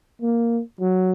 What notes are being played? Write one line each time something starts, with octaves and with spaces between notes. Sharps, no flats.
A#3
F#3